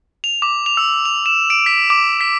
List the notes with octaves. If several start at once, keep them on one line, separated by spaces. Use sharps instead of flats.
F7
D6
F7
E6
F7
E7
D7
B6
D6
B6